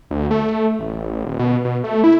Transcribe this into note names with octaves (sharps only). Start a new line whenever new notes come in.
D2
A3
A1
D#1
B2
B2
A3
E4